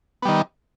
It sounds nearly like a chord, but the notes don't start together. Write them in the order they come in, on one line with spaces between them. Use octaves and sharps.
B3 G3 D#3